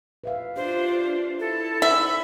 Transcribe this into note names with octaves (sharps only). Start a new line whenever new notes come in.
B4 E5 F5
D4 F4 G4 C5
E4 A4
D#4 C5 E5 B5